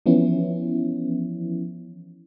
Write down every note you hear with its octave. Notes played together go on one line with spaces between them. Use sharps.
E3 F3 B3 C#4 E4